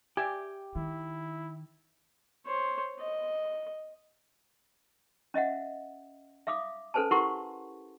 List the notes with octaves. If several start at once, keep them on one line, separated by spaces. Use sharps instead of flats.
G4 D5 E5 G#5
D#3 E4
C5 C#5
D#5
C#4 D#5 E5 F#5
E5 F5 D6 D#6
C#4 A4 B4 C5 G#5 A5
E4 G4 A#4 F#5 C6 C#6